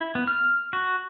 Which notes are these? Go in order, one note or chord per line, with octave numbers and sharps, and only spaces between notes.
E4
B3
F6
F#4